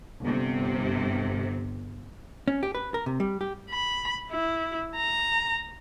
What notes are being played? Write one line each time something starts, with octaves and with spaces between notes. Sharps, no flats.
G1 C3
C#4
G4
B4
A#4
C3
G3
G4
B5
E4
A#5